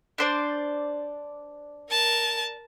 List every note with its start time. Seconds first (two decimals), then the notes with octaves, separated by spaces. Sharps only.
0.18 D4 C5 D5
1.90 A#4 A5